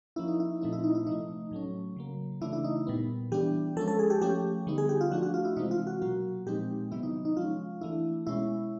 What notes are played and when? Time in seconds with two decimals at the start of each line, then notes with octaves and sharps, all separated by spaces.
0.16 F3 A#3 C#4 E4
0.28 D#4
0.40 E4
0.61 A#2 F3 A3 C4 D#4
0.73 E4
0.84 D#4
0.95 E4
1.06 C3 F3 A3 D#4
1.51 A2 F#3 A3 C#4
1.96 C#3 F#3 A#3
2.41 C#3 E3 A3 D4 E4
2.53 E4
2.64 D#4
2.87 A#2 G3 B3
3.32 E3 G3 B3 D4 G4
3.76 F3 G#3 C#4 A4
3.88 A4
3.99 G#4
4.10 G4
4.21 F3 A3 C#4 G4
4.67 D3 G3 B3 D#4
4.78 G#4
4.89 G4
5.01 F4
5.11 F3 A3 D4 F#4
5.23 F#4
5.34 F4
5.45 E4
5.57 C3 E3 G#3 C4 D#4
5.71 F4
5.87 F#4
6.02 B2 F#3 A#3 F#4
6.47 A#2 F3 G#3 C4 D#4 G4
6.91 C3 D#3 F#3 B3 E4
7.03 D#4
7.25 D#4
7.37 F3 G#3 C#4 F4
7.81 E3 A3 D4 E4
8.27 B2 G#3 C#4 E4